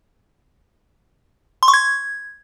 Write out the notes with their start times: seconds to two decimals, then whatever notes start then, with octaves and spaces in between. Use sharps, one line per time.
1.63 C6
1.68 C#6
1.74 G#6